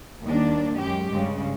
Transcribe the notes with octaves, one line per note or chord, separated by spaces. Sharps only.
D#2 D#3 G3 A#3 D4
F#2 G#3 C#4 G4
G2 C#3 G#3